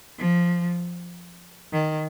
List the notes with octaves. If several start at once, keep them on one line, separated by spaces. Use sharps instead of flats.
F3
D#3